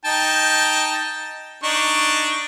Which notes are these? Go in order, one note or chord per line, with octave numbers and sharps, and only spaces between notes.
D#4 G5 A5
D4 D#4 C#6